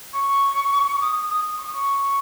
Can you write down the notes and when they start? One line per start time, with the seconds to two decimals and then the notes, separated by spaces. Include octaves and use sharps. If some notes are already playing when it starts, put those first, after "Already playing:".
0.13 C#6
1.01 D#6
1.29 D#6
1.58 C#6
1.66 D#6
1.73 C#6